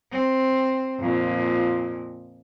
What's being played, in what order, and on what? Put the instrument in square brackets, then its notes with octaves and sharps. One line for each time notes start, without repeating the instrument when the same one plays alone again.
[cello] C4
F2 A#2